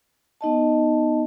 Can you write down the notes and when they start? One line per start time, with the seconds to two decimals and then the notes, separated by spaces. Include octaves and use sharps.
0.41 B3 D#4 D#5 A5